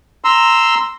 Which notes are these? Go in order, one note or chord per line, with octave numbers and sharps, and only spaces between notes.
A#5 C6 E6